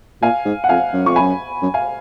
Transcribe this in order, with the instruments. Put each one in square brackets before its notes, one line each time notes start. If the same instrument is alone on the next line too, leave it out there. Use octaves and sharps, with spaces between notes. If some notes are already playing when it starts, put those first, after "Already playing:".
[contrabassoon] A#2 [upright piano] F5 G#5
[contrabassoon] G#2
[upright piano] F#5
[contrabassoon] F2 [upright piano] F5 G#5
[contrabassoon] F#2
[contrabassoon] F2 [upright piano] C#6
[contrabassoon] F#2 [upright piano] G#5 B5
[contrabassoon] F#2
[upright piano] F5 G#5